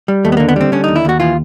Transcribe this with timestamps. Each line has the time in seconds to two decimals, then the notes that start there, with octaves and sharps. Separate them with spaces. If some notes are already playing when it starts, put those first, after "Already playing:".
0.08 G3
0.24 D#2 A3
0.32 B3
0.37 D3 A#3
0.49 B3
0.56 G3 C4
0.72 D3 C#4
0.84 D#2 D#4
0.96 E4
1.05 D#2 F#4
1.20 E3 F4